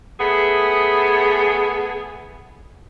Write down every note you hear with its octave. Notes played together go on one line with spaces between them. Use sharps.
A3 B3 G#4